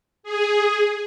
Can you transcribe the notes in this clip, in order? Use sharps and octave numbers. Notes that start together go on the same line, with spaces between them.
G#4